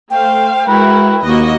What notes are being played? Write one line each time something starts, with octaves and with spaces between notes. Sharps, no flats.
A3 C5 F5 G5
G#3 E4 F#4 A#4 B4
D#2 A#3 F#4 D#5